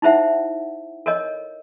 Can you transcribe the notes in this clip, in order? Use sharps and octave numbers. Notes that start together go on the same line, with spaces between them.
D#4 E4 C5 E5 F#5
A4 A#4 C#5 D#5